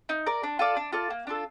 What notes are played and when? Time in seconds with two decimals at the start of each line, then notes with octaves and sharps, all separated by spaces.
0.09 D#4
0.26 A#4 D5
0.43 D4
0.59 F4 A4 D5
0.76 D4
0.92 F4 A4 D5
1.10 A#3
1.27 D4 F4 A4